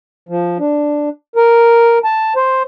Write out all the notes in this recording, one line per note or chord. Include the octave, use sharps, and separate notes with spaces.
F3
D4
A#4
A5
C5